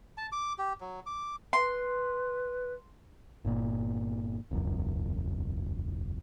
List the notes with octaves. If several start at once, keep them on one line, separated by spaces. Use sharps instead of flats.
A5
D6
G4
F#3
D6
B4 C6
G1 A#2
E1 C#2 F#2